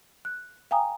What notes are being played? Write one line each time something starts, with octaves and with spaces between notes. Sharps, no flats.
F#6
F5 G5 G#5 A#5 D#6